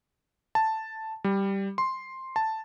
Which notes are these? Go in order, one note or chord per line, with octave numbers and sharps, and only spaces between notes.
A5
G3
C6
A5